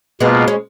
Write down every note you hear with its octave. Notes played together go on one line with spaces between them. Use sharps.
B2 G#3 A#3 B3 F4
C#4